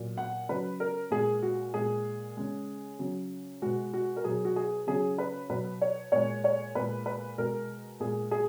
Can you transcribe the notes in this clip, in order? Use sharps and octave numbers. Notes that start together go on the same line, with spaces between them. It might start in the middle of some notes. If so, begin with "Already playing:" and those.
Already playing: A#2 F#3
F#5
C#3 F#3 B4
A#4
A#2 G#3 G#4
F#4
A#2 G#3 G#4
C#3 G#3
C#3 F#3
B2 G#3 F#4
F#4
A#4
B2 F#3 G#4
F#4
G#4
C#3 F#3 G#4
B4
B2 F#3 B4
C#5
A#2 G#3 C#5
C#5
A#2 G#3 B4
B4
B2 G#3 A#4
A#2 G#3 G#4
G#4